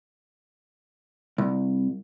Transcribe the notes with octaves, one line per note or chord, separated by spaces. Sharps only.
C2